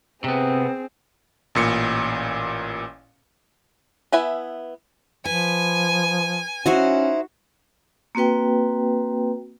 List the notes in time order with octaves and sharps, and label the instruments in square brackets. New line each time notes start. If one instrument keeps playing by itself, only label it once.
[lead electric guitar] C3 B3 [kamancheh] C4 G#4
[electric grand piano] A1 A#2 C#7
[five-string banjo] B3 E4 B4 E5 G#5
[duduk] F3 [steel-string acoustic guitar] B4 [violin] G#5
[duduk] C#4 [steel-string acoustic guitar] D#4 E4 C5 [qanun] F#4
[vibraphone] A#3 C4 F#4 B4 G5